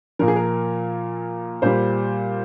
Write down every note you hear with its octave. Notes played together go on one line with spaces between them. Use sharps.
A#2 F3 A#4
G#4
A#4
A#2 G3 C5